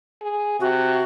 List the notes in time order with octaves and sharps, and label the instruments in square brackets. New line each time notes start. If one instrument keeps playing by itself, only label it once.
[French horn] G#4
[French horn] C3 [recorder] F#4